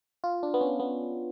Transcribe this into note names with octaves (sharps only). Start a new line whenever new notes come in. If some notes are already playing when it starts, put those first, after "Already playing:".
F4
D4
B3
C#4
B3